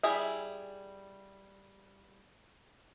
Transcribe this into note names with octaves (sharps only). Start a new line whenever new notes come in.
G3 E4 G#4 E5